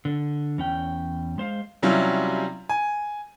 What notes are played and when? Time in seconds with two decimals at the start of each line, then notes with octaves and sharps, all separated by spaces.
0.05 D3
0.58 E2 C#4 G5
1.38 G#3 C5 F5
1.83 C3 F#3 G3 C#4 E4 F4
2.69 G#5